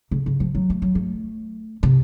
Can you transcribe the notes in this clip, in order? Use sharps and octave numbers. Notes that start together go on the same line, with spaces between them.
C#3
C#3
F3
F#3
A3
F#3
A3
C3